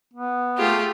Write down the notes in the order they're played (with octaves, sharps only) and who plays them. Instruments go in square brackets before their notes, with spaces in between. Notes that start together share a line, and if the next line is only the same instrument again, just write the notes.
[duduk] B3
[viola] A3 G#4 [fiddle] F4 G4